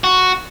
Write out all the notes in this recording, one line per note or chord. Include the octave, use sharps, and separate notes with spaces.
F#4